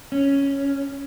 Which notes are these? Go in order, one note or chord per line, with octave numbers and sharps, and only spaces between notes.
C#4